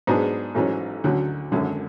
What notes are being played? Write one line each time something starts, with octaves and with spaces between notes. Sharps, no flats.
G#2 F#3 B3 D4 G#4
A1 G#2 F#3 C#4
D2 D3 F#3 C#4
G#1 F#2 D3 G#3